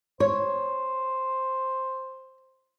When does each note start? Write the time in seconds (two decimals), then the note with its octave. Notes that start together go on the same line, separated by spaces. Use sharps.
0.20 C5 C#5